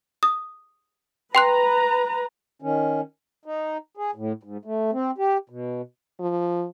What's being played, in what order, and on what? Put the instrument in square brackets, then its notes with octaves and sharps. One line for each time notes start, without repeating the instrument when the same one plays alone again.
[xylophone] D#6
[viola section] B4 A#5 [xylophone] G5 C6 F#6
[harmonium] D#3 C#4
D#4
G#4
A2
G#2
A3
C4
G4
B2
[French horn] F3